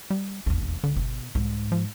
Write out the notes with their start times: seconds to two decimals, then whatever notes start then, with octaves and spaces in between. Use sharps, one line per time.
0.10 G3
0.46 E1 A1 D#2
0.84 C#2 D3
0.96 G1 B2
1.35 C2 G#2
1.72 F3